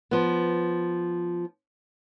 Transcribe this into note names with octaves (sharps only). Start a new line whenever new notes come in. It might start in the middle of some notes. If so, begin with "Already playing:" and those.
F3 B3